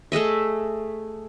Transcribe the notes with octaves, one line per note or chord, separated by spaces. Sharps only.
A3 G#4 D#5 E5